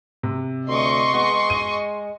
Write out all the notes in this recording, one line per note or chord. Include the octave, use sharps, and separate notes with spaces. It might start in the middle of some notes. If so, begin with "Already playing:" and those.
C3
D2 D#5 C6 C#6
G#3 B3
D#7